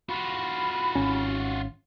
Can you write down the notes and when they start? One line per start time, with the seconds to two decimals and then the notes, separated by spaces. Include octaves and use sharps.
0.09 F4 F#4 B5
0.95 G#1 C#4